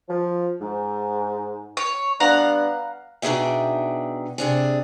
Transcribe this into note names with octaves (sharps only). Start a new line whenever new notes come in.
F3
G#2
C#5
G3 B3 D4 F5 F#5 A#5
B2 D4 D#4 G#4 E5 G5
C3 D4 G#4